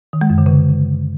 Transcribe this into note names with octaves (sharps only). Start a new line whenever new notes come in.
D#3
G#3
F#2
D3
C#3